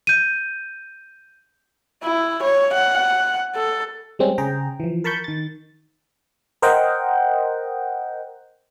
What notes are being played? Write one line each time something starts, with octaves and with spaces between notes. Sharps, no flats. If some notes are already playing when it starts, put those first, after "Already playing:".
G6 D#7
E4
C#5
F#5
A4
G3 G#3 C4 C#4
C#3 G#4 C5 G5 A#5
E3 F3
A#4 A5 B5 C#6 G6
D#3 A6
A#4 C5 D#5 F#5 G5